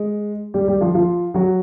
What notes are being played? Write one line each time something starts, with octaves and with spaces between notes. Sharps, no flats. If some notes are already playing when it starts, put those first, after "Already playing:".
Already playing: G#3
G3 G4
G3 G4
F3 F4
F3 F4
F#3 F#4